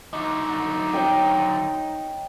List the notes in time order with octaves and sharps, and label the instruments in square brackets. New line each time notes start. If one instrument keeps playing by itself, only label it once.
[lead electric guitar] D3 F#3 [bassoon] D#4
[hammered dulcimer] C#5 D#5 G5